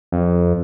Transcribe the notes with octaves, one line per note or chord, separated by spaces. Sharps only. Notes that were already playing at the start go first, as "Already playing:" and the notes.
F2